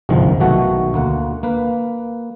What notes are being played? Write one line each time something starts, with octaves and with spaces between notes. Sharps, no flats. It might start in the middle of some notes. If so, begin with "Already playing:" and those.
G1 C2 G#2 C3 D#3 F3
B1 B2 D#3 A3 F#4 F#5
D2 A#3 F#5
A#3 B4